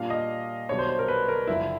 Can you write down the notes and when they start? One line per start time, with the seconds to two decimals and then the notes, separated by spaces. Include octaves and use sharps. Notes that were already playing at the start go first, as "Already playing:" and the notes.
Already playing: A#2 G3 A#3 D4 F5
0.10 D#5
0.69 B1 B2 G3 B3 D4 C#5
0.79 C5
0.89 C5
0.99 A#4
1.08 B4
1.28 A#4
1.47 F#1 F#2 D3 F3 E4